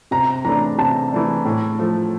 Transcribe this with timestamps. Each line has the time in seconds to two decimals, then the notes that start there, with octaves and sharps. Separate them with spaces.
0.11 C3 A#5
0.45 E3 A3 D4 A#5
0.78 C3 A5
1.12 E3 A3 D4
1.45 A2
1.79 F3 A3